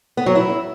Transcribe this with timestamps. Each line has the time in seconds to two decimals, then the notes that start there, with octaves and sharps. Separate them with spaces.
0.17 B3
0.26 F#3
0.35 E4